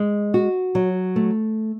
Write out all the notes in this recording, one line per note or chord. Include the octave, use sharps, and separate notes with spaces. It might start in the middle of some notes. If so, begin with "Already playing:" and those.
Already playing: G#3
F#4
F#3
A3